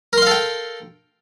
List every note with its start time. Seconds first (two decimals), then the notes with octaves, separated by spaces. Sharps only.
0.13 A#4
0.18 C6
0.22 F5
0.27 A4
0.31 G5